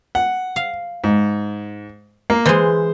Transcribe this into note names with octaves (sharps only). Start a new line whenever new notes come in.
F#5
F5
G#2
A#3
E3 G#3 C5